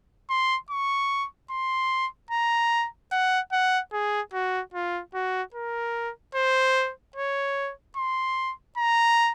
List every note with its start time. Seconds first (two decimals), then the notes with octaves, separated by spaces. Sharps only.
0.29 C6
0.70 C#6
1.51 C6
2.31 A#5
3.12 F#5
3.52 F#5
3.93 G#4
4.33 F#4
4.74 F4
5.14 F#4
5.54 A#4
6.35 C5
7.16 C#5
7.97 C6
8.77 A#5